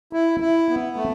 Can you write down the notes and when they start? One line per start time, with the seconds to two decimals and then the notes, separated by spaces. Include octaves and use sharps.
0.13 E4
0.40 E4
0.69 B3
0.96 A3